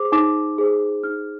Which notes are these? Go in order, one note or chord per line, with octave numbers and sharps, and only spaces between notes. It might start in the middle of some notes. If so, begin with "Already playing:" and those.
Already playing: G#4 C5 D6
D#4 D6
G#4 C5
D#4 F6